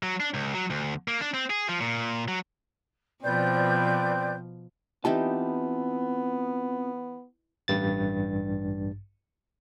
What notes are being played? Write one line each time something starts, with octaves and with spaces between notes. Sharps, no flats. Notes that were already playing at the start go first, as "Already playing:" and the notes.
F#3
D4
C#2
F#3
D2
A#3
D4
C4
G#4
F3
A#2
F#3
B2 F3 C4 B4 D5 G6
E3 B3 C4 D#4 F4 G4 A5
A1 G2 A6